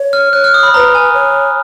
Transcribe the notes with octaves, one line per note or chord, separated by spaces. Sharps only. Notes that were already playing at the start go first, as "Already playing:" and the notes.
Already playing: C#5
F6
C#5 F#6
F6
D#6
B5
B4 C#5 A#5
G#5
C#5